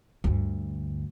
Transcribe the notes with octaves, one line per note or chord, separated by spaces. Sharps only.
D2 G2